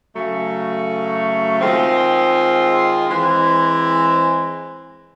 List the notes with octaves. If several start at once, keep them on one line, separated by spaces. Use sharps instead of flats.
C#3 F#3 A3
D#3 G#3 C4 F4
E3 G#3 C4